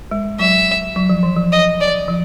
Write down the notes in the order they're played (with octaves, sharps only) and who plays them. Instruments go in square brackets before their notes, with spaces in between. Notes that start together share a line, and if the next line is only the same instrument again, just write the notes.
[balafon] G#3
[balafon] F#3 [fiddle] E5
[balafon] F#3
F3
E3
F3
[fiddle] D#5
D5
[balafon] F3